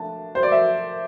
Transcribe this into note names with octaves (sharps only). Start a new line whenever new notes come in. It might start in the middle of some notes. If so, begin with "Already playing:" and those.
Already playing: A3 D4 A5
C5
D5
E5